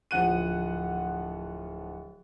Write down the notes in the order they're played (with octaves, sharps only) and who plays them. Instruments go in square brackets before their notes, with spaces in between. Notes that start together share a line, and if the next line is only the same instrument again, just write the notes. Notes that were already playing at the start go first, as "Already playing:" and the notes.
[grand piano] D1 F3 F#5 F#6 D#7